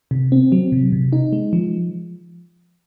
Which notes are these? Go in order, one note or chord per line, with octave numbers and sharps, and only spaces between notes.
C3
C4
F#3
C3
C3
D#4
G#3
F3